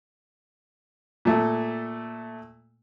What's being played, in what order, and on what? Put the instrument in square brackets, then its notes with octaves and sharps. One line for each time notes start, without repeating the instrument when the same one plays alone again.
[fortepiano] A#2 A3